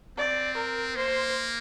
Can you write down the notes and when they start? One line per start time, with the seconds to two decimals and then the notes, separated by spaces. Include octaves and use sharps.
0.17 C4 D5
0.57 A#4
0.96 A#3 C5